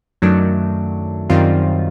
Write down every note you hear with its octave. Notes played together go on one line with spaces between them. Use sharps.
F#2 D#3 F#3 A3 D4
F#2 D#3 G3 C4 F4